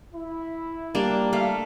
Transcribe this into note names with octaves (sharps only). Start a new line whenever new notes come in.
E4
G3 A#3 D4
A3 F5